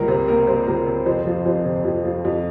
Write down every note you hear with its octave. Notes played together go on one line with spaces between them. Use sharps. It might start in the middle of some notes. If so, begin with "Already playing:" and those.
Already playing: C#2 G3 A#3 A#4 C#5
C3 C5
A#3 A#4
G3 C5
C#2 A#4
C3
F2 C5
F3
F2 C5
C3
F2
F3
F2